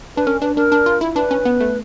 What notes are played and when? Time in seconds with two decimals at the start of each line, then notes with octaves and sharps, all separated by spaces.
0.17 D4 B4
0.27 C#4 A#4
0.41 D4 B4
0.56 D4 A#4
0.72 D4
0.86 F4
1.01 E4
1.15 D4 B4
1.31 C#4
1.45 B3
1.60 A3